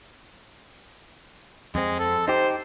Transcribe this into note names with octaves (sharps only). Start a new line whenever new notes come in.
F2 G#3 C4
A4
D#4 G4 C5